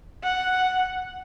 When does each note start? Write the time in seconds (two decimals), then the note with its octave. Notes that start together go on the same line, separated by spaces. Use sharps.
0.23 F#5